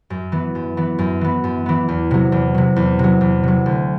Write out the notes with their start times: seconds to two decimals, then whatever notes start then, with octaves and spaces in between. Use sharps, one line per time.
0.10 F#2
0.32 E3 B3
0.55 F#2
0.77 E3 B3
0.99 F#2
1.21 E3 B3
1.44 F#2
1.66 E3 B3
1.89 E2
2.11 C3 F#3
2.32 E2
2.54 C3 F#3
2.76 E2
2.99 C3 F#3
3.21 E2
3.43 C3 F#3
3.66 D2